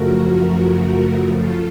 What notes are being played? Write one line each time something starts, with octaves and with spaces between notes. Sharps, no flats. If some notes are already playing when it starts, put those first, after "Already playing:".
Already playing: F#2 C#3 F3 A3 F#4 A#4
F4 A4